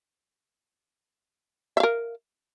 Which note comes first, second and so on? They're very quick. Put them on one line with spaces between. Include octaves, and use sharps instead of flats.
E5 F5 A#4